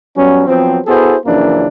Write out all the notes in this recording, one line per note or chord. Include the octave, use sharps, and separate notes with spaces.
F#3 G3 B3 C#4
F3 F#3 B3 C4
B3 E4 F#4 G#4 A4 C5
F#2 C#3 E3 F3 A#3 D4